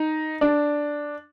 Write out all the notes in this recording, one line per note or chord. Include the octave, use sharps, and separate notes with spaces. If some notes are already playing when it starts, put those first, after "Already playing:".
Already playing: D#4
D4